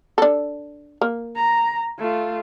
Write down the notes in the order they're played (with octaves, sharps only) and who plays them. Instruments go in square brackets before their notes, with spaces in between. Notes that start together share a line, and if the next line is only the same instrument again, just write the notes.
[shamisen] D4 A4
A#3
[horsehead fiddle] A#5
A3 F4